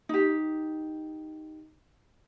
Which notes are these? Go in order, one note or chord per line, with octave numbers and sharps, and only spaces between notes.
D#4 G4